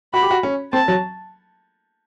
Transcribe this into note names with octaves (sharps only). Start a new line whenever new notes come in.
F#4 B5
G4
F#4
C#4
C4 A5
F#3